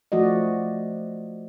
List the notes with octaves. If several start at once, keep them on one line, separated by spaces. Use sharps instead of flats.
F3 A3 F#4 D5 D#5